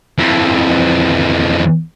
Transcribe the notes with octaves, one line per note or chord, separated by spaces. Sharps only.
F2 E3